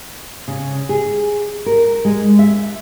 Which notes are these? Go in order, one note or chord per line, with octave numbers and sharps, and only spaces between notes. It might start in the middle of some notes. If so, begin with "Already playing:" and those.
C#3
G#4
A#4
G#3
E5